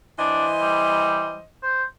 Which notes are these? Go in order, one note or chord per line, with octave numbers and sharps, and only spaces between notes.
E3 D4 C5 D#5
G3
C5